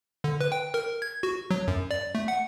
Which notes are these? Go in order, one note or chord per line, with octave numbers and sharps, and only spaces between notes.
D3
B4
G5
A#4
G#6
F#4
F#3
F#2
D5
A3
F#5